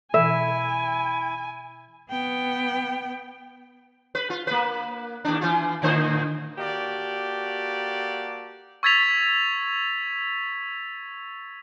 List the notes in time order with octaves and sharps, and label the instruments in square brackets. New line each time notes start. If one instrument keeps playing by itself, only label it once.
[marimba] B2 E3 A4 [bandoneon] E4 [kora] E5 [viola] G#5
[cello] B3 G5
[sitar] B4
F4
A#3 B4
D#2 D4
E3 F4
A2 D3 C5
[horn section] A#3 F#4 G4 A4 D5
[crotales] C#6 E6 G#6 A6 B6 F7